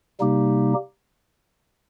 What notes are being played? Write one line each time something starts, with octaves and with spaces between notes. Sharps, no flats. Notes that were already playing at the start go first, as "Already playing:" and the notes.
C3 G3 A#3 D#4 G4